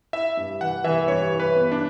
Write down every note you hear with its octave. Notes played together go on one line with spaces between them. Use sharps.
E4 E5
G2
E3 F#5
E3 E5
G2 C#5
E4
B4
B3
D4